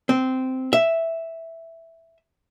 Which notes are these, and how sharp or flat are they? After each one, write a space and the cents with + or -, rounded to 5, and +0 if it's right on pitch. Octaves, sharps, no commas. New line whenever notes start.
C4 -10
E5 +0